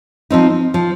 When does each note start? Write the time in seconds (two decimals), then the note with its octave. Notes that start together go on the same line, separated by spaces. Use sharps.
0.30 F3 C4 D#4
0.74 F3